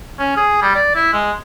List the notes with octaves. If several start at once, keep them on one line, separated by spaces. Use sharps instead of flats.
C#4
G#4
G3
D5
E4
G#3